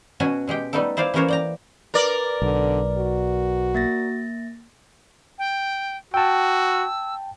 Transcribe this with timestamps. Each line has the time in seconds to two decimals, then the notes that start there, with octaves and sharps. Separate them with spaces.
0.20 B2 F#3 C#4 F#4 G#5
0.47 B2 G#3 G4 G5
0.73 G3 A3 B3 D#4 A4
0.97 E4 C5 D5 F5
1.14 E3 A#3 C#4 A#4 C5 C#5
1.28 D5 G5 A#5
1.94 A#4 B4 D5
2.42 B1 D3
2.98 F#4
3.75 A#3 A6 A#6
5.39 G5
6.14 F#4 G5 A5 E6